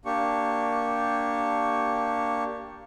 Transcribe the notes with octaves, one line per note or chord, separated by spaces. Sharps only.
A#3 D4 G4 C#6